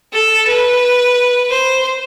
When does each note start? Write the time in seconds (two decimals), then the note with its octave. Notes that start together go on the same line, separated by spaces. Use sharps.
0.13 A4
0.47 B4
1.50 C5